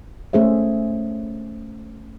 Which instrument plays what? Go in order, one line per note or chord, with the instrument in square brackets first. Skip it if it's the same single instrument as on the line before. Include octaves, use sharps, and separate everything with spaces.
[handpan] A3 C#4 G#4 C5 E5